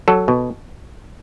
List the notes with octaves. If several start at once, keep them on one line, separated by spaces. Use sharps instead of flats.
F#3 A4
B2